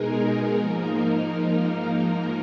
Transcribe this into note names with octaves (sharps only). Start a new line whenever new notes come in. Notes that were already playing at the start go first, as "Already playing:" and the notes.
Already playing: B2 G#3 D#4 G#4 A#4
G#2 F3 A#3 D#4 A#4